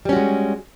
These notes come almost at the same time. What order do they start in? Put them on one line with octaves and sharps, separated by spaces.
G3 C#4 F#4 G#3